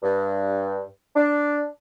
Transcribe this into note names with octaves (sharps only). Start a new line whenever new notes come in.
G2
D4